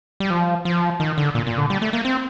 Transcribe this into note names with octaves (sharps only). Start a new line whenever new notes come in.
G3
F3
F3
D#3
D3
A#2
A#2
D3
G3
A3
A#3
C4